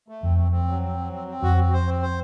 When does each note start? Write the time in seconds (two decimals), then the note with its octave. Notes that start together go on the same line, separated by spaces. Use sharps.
0.08 A3
0.23 F2 C4
0.38 C4
0.52 C4
0.68 F#3
0.82 C4
0.98 F#3
1.13 C4
1.28 C4
1.42 F2 F#4
1.57 C4
1.73 C5
1.87 C4
2.02 C5